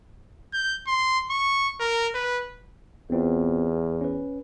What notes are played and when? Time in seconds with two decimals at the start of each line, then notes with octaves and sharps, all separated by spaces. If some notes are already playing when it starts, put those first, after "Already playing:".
0.53 G6
0.87 C6
1.30 C#6
1.80 A#4
2.15 B4
3.10 E2 B3 C4 F4
4.01 C#4 B4